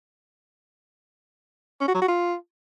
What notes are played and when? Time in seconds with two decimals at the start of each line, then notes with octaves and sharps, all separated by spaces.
1.81 C#4
1.88 F#4
1.95 F#3
2.02 F#4
2.08 F4